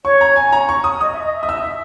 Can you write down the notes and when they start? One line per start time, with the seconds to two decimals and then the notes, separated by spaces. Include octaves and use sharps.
0.05 C#5 C#6
0.21 A#5
0.36 G#5
0.52 A#5
0.69 C#6
0.84 D#6
1.01 D#5 D#6
1.13 E5
1.24 D#5
1.36 E5
1.43 D#6
1.49 E6